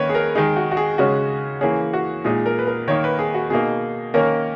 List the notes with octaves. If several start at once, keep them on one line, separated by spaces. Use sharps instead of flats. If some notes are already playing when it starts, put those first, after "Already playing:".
Already playing: D#3 A#3 C#4 B4 C#5
G#4
A#4
D#3 G#3 D#4 G#4
F#4
F#4
G#4
C#3 G#3 C#4 F#4
E3 A#3 C#4 G#4
F#4
A#2 G#3 D#4 G#4
A#4
B4
A#4
D#3 A#3 D#4 C#5
B4
G#4
F#4
B2 A#3 D#4 G#4
D#3 A#3 C#4 A#4